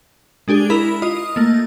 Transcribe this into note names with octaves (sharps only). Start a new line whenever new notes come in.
G#3 D4 G4 G#4
E4 A#4 B5
F4 D#5 D#6
A3 A#3